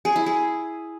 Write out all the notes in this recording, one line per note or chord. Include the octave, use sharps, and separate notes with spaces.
G#4
E4
G#4